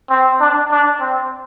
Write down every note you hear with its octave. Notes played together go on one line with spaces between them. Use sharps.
C4
D4
D4
C4